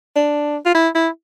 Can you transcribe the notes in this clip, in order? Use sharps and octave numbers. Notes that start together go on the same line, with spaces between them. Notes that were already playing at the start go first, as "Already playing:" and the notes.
D4
F4
E4
E4